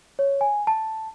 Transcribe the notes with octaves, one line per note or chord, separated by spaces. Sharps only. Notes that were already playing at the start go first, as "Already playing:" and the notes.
C#5
G#5
A5